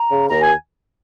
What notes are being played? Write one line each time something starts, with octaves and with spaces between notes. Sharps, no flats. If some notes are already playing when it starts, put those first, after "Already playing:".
Already playing: A#5
C#3
D#2 A#5
G#5